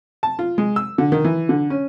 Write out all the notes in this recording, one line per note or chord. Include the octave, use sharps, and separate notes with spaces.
A5
F4
G#3
E6
D3
D#3
E3
D3
C#4